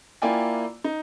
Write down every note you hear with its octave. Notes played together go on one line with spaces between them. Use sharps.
A#3 E4 F4 D5 G5 G#5
D#4